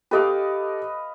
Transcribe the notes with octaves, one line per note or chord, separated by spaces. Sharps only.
G4 A4 B4 D#5 F5 D6